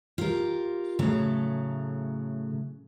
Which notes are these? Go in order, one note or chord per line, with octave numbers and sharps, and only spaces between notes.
F4 G4 A#4
A2 C#3 F#3 A3 A#5